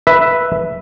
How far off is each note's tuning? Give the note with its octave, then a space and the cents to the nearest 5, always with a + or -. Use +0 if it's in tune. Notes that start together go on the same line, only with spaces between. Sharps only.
B4 +0 E5 +0